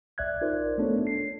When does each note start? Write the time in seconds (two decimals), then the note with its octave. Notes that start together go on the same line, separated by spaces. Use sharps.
0.18 B1 D5 E5 F#6 G#6
0.41 D#4 F4 A#4 C5 D5
0.78 A3 B3 D4 A4 C#5
1.07 C7